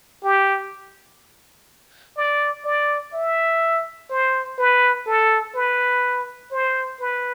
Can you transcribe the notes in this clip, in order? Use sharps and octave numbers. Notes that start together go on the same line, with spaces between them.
G4
D5
D5
E5
C5
B4
A4
B4
C5
B4